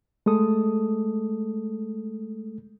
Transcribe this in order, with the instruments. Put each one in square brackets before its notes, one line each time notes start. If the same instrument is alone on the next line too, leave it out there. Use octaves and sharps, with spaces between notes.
[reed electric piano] G#3 A3 A4 D#6